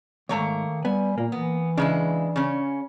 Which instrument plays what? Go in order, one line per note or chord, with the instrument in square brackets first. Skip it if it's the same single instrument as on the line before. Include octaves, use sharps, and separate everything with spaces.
[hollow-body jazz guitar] D2 G#2 [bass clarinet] D#3 [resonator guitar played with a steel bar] A3 A#3 C#5
[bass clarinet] G3 [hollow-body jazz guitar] B3 [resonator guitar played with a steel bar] G#5
[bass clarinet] A#2 [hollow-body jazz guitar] A#3
[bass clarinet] E3 [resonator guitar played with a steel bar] B3
[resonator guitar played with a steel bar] C#3 G#3 E4 [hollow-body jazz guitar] D4
[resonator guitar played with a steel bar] C#3 C#4